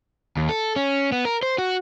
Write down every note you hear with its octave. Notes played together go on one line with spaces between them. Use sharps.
D#2
A4
C#4
B3
A#4
C5
F#4